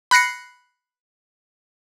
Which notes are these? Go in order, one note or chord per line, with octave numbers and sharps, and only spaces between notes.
B5 F#6 A#6 C7 C#7